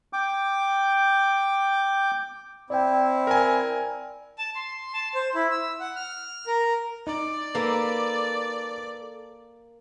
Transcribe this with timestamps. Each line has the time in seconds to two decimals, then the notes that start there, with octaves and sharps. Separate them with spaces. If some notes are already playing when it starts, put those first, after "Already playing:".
0.13 G5 D6
2.70 C4 E4 D5 G5
3.27 A#4 G#5
4.38 A5
4.55 C6
4.94 A5
5.15 C5
5.35 E4
5.51 E6
5.80 F#5
5.96 F6
6.47 A#4
7.07 D#4 D5
7.55 A#3 A4 B4